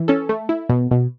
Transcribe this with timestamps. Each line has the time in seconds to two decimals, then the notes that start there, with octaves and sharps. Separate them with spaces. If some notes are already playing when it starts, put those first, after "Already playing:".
Already playing: E3
0.08 C#4 A4
0.29 A3
0.49 E4
0.69 B2
0.91 B2